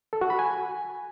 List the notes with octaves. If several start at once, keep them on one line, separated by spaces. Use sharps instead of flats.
A4
F#4
B5
G#5